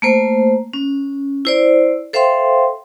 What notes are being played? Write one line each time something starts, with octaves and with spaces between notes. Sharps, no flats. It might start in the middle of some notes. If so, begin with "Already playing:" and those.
A3 A#3 C5
C#4
E4 C5 D5
A4 C5 E5 F5 G5 C6